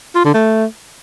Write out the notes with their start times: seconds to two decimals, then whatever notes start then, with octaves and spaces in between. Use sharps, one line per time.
0.15 F4
0.25 D3
0.34 A3